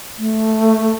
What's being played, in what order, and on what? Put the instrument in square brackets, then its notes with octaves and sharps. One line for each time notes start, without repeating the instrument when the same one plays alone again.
[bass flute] A3